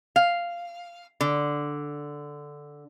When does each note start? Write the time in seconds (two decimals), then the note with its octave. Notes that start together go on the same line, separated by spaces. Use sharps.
0.16 F5
1.21 D3